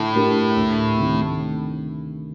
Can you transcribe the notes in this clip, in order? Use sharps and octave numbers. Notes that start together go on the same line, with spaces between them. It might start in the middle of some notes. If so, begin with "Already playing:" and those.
Already playing: A2 D3
A3 D4 G4 A#4
D2
C3 D#3 A3